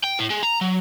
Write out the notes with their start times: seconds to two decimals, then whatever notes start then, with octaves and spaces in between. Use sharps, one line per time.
0.04 G5
0.19 A2
0.30 G#3
0.43 A#5
0.61 F#3